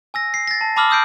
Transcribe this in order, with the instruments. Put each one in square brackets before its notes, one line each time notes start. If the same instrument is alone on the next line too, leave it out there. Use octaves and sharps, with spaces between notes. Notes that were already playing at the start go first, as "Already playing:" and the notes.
[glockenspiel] G#5 E6 A#6
C7
A6 A#6
A5
A5 B5 D6 E6 F6 F#7
D#6 E6 G6 C7 D7